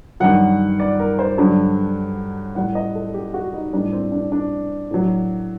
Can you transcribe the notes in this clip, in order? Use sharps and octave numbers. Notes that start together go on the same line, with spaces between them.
G2 D#3 F#3 F#5
D5
A#4
C5
G2 D3 F#3
A2 G3 F#5
D#5
A4
G4
F#4
D#4
A2 G3 D4
C4
D4
D4
A2 F#3